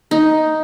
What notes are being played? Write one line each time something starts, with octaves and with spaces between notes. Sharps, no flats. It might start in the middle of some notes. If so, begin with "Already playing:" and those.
D#4